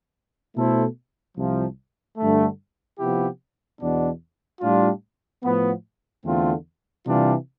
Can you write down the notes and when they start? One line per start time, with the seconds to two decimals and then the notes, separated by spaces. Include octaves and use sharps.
0.56 B2 A3 E4 A4 C5
1.37 C2 C3 F3
2.18 G2 D3 A3
2.99 C3 F3 B3 E4 G4
3.81 E2 B2 B3 D4
4.61 A2 G3 D4 F4
5.43 A2 F3 B3
6.24 E2 D3 A3 C4 F4
7.06 C3 E3 G3 D4 F4